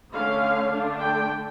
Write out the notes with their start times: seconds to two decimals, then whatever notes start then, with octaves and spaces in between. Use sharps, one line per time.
0.13 D3 A3 C#4 F5
0.71 D3 A3 D4
1.01 G5